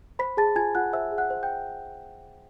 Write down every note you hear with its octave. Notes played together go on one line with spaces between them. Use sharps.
C5 B5 B6
G#4 A5 A6
F4 G#5 G#6
F4 F#5 F#6
C5 E5 E6
G#4
F#5 F#6
C5
G5 G6